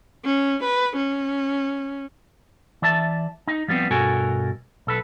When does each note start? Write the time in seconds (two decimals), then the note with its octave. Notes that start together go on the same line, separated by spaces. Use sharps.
0.25 C#4
0.64 B4
0.96 C#4
2.82 E3 D5 E5 A5
3.47 D#4
3.68 F3 G3 B3 C4
3.91 G2 B2 F#4 A4 A#4 G#5
4.87 B1 A4 B4